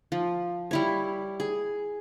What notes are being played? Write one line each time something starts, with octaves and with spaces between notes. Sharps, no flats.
F3
G3 E4 C#5
G#4